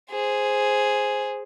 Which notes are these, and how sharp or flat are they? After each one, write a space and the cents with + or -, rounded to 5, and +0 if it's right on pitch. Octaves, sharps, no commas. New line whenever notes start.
G#4 +0 C5 +0